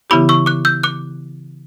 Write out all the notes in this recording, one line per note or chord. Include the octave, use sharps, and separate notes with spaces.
C#3 E3 B3 E4 G4 B5 D6
C#6 E6
D6 F#6
E6 G6
D6 F#6